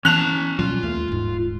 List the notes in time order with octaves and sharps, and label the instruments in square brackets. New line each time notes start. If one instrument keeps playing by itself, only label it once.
[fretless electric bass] E3 B3 [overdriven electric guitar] C#4 A5 [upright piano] F#6 F7
[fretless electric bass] B2 F#3 G3 [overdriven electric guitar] F4
[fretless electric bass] D#2 A3
D#1 G#2